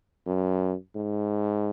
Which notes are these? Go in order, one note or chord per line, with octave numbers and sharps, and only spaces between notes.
F#2
G#2